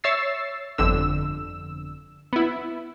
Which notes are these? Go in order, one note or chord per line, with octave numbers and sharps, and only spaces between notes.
C#5 E5 E6 A6 C7
G1 F2 D3 E6
B3 E4